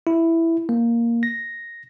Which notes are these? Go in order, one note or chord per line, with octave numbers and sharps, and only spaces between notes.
E4
A#3
A#6